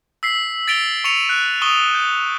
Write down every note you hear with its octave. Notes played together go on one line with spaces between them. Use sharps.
E6 B6 C7
A6 B6 D7 F7 G7
C#6 C#7 D#7 F7
C#6 F#6
C#6 D#6 D#7 E7 G7
G6